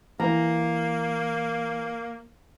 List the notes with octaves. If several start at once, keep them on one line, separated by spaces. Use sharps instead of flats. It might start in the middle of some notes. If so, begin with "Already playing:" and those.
E3 A#3 A#5